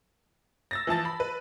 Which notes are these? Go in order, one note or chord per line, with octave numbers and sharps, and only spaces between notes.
E6 A6 A#6
E3 F3 A5 A6
B5
B4